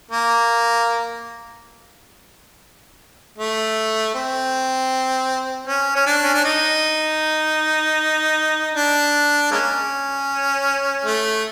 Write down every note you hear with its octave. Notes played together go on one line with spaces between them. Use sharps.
A#3
A3
C4
C#4
C#4
D4
C#4
D4
D#4
D4
G#3 A#3 C#4
A3